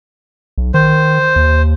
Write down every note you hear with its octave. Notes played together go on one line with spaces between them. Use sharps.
B1
D#3 C5
D#2